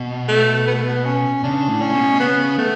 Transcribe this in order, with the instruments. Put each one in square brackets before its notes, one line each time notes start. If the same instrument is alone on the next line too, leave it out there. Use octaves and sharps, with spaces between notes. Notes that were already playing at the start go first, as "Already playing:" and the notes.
Already playing: [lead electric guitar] B2
[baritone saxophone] A3
B3
A3
B3
C#4
[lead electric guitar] C#3 [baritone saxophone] D4
[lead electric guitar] A2
[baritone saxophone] C#4
[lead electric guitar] B2
[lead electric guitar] C#3 [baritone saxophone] B3
[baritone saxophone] A3 [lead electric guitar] B3